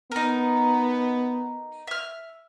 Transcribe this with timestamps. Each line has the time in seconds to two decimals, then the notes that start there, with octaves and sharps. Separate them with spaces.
0.12 B3 D#4 A#4
1.87 E5 F6